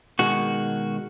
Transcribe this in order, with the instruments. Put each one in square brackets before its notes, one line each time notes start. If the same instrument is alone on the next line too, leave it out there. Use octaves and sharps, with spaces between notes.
[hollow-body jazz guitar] B2 D#3 G#3 [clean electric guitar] F#4